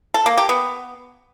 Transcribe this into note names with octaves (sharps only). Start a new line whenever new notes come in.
A4
A#3
G4
B3